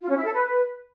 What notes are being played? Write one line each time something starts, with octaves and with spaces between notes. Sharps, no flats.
F4
C#4
E4
A4
B4